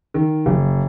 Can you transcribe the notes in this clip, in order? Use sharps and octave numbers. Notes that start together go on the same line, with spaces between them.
D#3
F#1